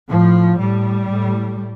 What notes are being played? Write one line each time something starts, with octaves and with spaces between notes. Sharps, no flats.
A2 F3
A2 G3
A2